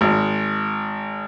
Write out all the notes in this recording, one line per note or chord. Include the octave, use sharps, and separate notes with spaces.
G#1